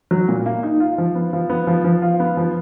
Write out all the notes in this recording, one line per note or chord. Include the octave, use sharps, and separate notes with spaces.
F#3
A#2
A#3
D#4
F4
F3
B3
F3
B3
F3
F3
F4
B3
F3